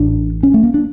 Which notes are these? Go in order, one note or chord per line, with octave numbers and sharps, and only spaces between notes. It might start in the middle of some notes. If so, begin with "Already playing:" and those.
Already playing: A1 A2 D4
C#4
A3
A#3
D4